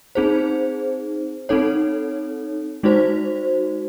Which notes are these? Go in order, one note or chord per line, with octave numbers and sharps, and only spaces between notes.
C4 D#4 G#4 C5
C4 D#4 A4 C#5
G#3 D#4 F#4 C5